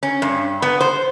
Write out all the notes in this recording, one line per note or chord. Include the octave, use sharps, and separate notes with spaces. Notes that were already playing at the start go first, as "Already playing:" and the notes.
C#4
G2
B3
C5